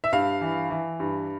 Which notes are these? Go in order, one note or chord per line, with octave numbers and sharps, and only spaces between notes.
E5
G2 F5
E3
E3
G2